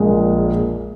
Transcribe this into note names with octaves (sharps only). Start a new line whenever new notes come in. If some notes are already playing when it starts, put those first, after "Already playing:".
Already playing: A#1 A#2 G#3